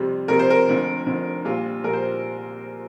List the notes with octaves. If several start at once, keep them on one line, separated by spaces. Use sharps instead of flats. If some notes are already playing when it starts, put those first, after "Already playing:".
Already playing: F2 C3 G3
F2 C3 G3 A#4
C5
A#4
F1 F2 D3
F1 F2 D3
A#1 A#2 G3 F4
A#1 A#2 G3 A#4
C5